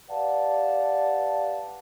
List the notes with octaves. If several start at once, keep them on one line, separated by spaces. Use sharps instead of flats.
G4 B4 D5 F5 F#5 A5